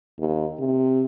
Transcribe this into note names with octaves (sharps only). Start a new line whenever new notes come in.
D#2
C3